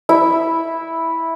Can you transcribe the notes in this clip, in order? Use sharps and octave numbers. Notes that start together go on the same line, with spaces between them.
E4 E5